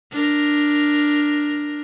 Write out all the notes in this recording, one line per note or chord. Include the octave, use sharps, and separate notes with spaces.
D4 A#4